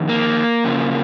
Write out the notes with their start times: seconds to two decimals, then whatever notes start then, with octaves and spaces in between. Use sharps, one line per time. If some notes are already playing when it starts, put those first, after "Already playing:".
Already playing: F2 D#3
0.09 A#3
0.64 F2 C#3 F3